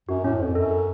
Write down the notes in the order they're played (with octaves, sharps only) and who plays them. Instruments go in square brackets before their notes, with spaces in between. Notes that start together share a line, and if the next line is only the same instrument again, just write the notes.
[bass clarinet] F#2 [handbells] F#4
[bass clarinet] A2 [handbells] C#4
[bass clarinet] F2 [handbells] C5
[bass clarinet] F#2 [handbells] A4
[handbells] A4